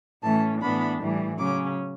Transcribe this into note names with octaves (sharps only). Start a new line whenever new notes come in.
A2 E3 A3 C#4 A5
A2 E3 B3 D4 B5
A2 E3 G3
C#3 F#3 C#4 D6